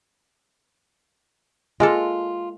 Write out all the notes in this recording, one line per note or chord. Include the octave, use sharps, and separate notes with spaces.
G#3 A#3 F4 A4